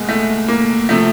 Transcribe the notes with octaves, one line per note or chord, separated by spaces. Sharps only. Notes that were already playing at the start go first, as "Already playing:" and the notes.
Already playing: C2 B2 G#3 A#3
A3
A#3
C3 F3 A3